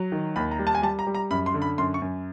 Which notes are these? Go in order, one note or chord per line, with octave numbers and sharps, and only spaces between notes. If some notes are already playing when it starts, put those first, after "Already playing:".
Already playing: F#3
D#3
D#2 B5
A#5
G3
A5
G#5
G3 A5
A#5
G3
A#5
F#2 B5
C6
D3
B5
F#2 C6
C#6
F#2